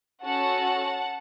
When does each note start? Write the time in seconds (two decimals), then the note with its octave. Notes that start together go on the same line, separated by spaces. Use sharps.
0.23 C#4 F#4 A4 F#5 A5